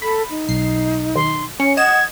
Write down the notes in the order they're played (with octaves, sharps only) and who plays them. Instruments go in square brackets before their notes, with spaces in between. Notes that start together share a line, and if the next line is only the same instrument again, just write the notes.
[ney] A4 [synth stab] B5
[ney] D#4
[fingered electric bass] B1 [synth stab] C7
[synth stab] D#2 [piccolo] C6
[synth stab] C#4 [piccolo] C#7
[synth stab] D#5 E7 [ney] F#5 [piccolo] G#6